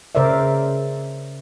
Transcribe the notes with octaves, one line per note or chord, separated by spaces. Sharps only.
C#3 A#4 C5 D5 E5